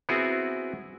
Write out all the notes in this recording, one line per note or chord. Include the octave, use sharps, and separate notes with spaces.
B3 C4 E4 F#4 G#4